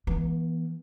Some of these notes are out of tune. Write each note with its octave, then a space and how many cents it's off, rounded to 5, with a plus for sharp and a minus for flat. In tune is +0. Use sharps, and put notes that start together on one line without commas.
E3 +0 B3 -35